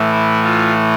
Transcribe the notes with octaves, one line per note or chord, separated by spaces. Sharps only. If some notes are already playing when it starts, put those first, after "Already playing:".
Already playing: A2 E3 A3
E4
F4